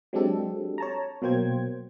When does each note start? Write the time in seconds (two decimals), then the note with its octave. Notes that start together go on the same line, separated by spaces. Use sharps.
0.13 F#3 G#3 C4 D4 G4 A4
0.78 C#5 A5 A#5
1.22 B2 F#3 A#3 C5 G5 G#6